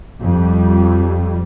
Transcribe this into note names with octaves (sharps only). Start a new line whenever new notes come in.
F2 G3